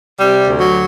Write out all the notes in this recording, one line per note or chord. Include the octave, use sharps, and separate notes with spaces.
C3 G3
D2
F#3